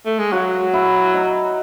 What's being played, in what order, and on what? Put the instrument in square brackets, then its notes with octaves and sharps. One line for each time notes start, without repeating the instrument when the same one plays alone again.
[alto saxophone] A3
G#3
[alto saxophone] F#3 [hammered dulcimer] F#4
[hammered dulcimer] E4
D#4